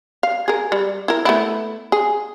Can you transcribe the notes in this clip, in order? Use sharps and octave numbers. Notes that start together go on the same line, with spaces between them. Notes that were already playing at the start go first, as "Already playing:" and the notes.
F5
G#4 A#4
G3
E4 A#4
A3 B3 E4
G#4